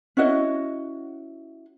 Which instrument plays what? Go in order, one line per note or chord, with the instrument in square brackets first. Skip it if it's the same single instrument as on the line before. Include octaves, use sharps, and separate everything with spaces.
[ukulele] C#4 E4 F#4 D#5